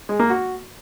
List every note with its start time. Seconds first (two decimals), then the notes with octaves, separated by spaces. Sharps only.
0.09 G#3
0.19 A#3
0.30 F#4